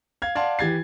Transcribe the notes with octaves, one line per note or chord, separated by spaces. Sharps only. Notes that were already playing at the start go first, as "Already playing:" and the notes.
F5 G#6
D5 F5 F#5 A5 C6
E3 G4 G#6 A6 C7